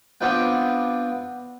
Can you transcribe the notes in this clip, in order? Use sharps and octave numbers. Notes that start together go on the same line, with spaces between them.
B3 C4 D4 F4 B4 G5